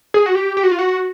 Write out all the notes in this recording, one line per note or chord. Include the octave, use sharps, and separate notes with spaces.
G#4
F#4
G4
G4
F#4
F4
F#4